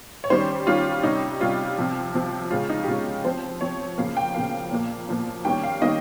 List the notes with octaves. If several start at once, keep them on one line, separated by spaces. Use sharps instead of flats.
C#5
D#3 G3 C#4 C5
D#3 G3 C#4 F4
C3 G3 C#4 D#4
C3 G3 C#4 F4
C3 F3 C4
C3 F3 C4
C#3 G#3 C#4 F4
D#4
G4
C#3 G#3 C#4 F4
F3 C4 C5
F3 C4 C#5
C#3 F3 A#3 F5
G5
C#3 F3 A#3 F5
A#2 F3 A#3
A#2 F3 A#3
D#3 G3 A#3 C#4 G5
F5
D#3 G3 A#3 C#4 D#5